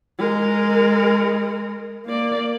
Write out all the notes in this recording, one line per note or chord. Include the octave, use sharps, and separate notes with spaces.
G#3 A#4
A#3 D5